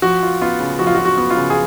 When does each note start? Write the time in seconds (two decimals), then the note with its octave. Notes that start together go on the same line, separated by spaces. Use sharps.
0.02 F3 F#4
0.23 F4
0.41 B3 F4
0.60 C#3
0.79 F3 F#4
0.87 F4
0.95 F#4
0.98 F4
1.05 F#4
1.18 B3
1.30 F4
1.36 C#3
1.50 G#4